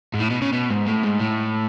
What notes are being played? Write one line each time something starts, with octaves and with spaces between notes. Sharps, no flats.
G#2
A2
B2
C#3
B2
G#2
A2
G#2
A2